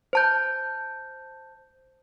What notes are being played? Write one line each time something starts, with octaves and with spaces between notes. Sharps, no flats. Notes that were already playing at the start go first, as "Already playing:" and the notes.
C5 A5 G6